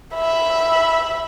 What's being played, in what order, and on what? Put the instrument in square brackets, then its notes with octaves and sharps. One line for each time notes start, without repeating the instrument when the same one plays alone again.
[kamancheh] E5 B5